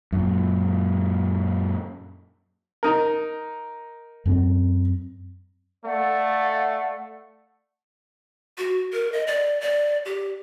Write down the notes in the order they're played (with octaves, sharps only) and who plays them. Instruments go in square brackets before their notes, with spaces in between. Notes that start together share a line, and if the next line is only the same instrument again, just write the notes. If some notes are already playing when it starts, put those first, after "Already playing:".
[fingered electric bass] F#2 A#2
[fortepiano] D#4 A#4
[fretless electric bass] F#2 B3 C4
[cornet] A3 [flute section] D5 F5 F#5
[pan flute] F#4
A#4
D#5
D5
D5
G4